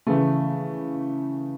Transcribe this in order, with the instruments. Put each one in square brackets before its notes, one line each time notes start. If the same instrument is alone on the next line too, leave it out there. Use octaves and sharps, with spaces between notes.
[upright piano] C#3 E3 A3